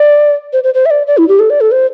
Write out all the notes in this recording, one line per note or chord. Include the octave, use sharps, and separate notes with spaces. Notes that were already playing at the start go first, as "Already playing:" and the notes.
Already playing: D5
C5
C5
C5
E5
D5
D5
E4
G4
A4
D5
A4
C5